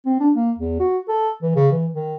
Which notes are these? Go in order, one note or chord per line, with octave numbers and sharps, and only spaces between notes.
C4
D4
A#3
E2
F#4
A4
E3
C#3
E3
D#3